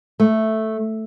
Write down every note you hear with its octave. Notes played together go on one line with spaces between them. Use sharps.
A3